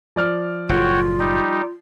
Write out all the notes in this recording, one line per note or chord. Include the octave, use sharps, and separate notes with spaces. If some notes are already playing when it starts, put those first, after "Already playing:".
F3 D5 F6
F#1 A2 F4 F#4 C#5 G5
G3 D#4 G4